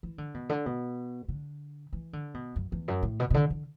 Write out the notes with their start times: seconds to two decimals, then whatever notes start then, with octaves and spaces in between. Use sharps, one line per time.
0.03 E3
0.18 D3
0.34 B2
0.49 D3
0.66 B2
1.28 D3
1.93 E3
2.13 D3
2.34 B2
2.56 F#2
2.72 E2
2.88 F#2
3.03 A2
3.20 B2
3.30 B2
3.34 D3
3.50 D3